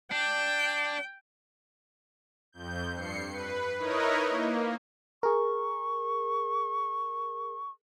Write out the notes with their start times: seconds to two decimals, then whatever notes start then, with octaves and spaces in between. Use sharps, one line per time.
0.12 D4 G5
2.52 F2 G6
2.93 G2 C7 C#7
3.31 B4
3.78 D#4 E4 A#4 B4 C#5 D#5
4.30 A#3
5.23 G#4 A#4 C#6